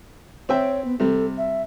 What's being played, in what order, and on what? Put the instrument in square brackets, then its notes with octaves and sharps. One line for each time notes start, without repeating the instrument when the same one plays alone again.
[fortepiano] C4 E5 G5 [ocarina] C#5
[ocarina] B3
[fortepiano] C3 G3 [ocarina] A4
[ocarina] E5